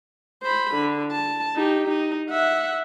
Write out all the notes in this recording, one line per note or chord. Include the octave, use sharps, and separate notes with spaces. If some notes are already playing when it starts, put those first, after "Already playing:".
C5 B5
D3
A5
D#4 G4
D#4
E5 F#5